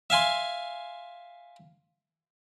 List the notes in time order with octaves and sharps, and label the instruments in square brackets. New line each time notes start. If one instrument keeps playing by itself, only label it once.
[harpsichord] E5 F5 G#5 C6